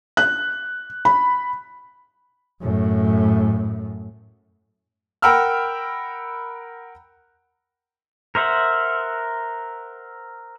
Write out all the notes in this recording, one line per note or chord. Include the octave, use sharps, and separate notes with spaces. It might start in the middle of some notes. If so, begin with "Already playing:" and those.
F#6
B5
F#2 A2
A#4 F#5 G5 B5 E6 F6
A#4 C5 E5 F#5